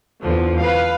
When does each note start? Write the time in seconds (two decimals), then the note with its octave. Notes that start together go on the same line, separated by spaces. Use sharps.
0.23 E2 D3 F3
0.60 B4 F5